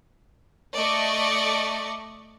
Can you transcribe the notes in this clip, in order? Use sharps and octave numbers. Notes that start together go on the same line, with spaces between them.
A3 D5 D#5 C#6